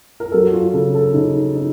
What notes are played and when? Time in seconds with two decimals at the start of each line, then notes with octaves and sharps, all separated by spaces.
0.20 A#4
0.32 F#3 A4
0.43 F#4
0.54 F4
0.74 C#3 A4
0.95 A4
1.14 C#3 D#4
1.55 D#4